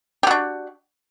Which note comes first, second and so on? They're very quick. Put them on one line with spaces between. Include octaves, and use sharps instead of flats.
G4 F#4 D4